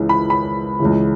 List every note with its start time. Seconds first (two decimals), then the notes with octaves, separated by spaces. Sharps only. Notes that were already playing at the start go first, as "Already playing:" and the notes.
Already playing: C#2 C#3 E3
0.09 B5
0.30 B5
0.80 C#2 C#3 E3